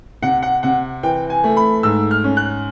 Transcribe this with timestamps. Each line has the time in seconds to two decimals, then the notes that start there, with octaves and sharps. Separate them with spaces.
0.23 C3 F#5
0.43 F#5
0.63 C3 F#5
1.03 E3 G5
1.30 G#5
1.44 A3
1.57 B5
1.83 G#2 E6
2.11 F6
2.24 C#4
2.37 F#6